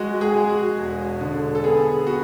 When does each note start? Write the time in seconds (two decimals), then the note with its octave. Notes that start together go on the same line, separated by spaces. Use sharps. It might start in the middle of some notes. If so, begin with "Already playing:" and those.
Already playing: G#3 F#4
0.21 G#4
0.35 G#3
0.49 F#4
0.78 E1
1.21 D3
1.55 A4
1.64 B3 G#4
2.07 B3 F#4